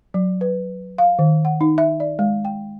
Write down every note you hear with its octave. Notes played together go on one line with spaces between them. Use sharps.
F#3
B4
F5
D#3
F#5
D#4
E5
D5
G#3
G5